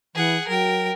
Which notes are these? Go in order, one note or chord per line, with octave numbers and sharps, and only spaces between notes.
E3 G#4 F#5
F#3 A#4 G5